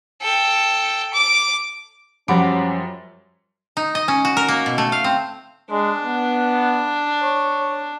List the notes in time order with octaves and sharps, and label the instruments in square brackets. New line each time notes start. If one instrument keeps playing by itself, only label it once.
[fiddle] A4 G5
D6
[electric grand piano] F#2 G3 D7 [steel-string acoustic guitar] F3 [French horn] C#4 [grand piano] F#5 B5 D6
[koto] D#4
D#5
C#4
F#4
A#4
A#3
B2
A3
F5
C4
[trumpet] G#3 [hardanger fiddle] D4
[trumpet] B3
C#5